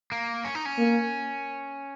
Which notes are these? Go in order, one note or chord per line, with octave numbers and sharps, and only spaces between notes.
A#3
C#4
D#4
C#4
A#3